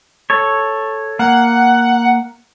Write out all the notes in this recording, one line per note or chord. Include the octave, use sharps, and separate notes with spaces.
A4 C#5
A#3 F#5